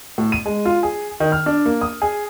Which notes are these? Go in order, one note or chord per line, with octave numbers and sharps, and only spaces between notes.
A2
D#7
G#3
F4
G#4
D#3
F6
D4
A#3
D#6
G#4